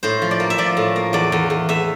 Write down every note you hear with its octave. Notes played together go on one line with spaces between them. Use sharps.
A2 C5
F3
D5
A#3
E5
F3 D5
A2
A#3
E2 D5
E2
E2
E2 E5